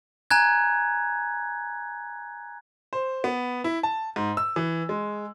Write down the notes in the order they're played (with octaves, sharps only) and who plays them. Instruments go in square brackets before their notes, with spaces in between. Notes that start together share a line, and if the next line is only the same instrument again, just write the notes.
[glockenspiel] G#5 A#5 F#6 G#6
[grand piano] C5
B3
E4
A5
G#2
E6
E3
G#3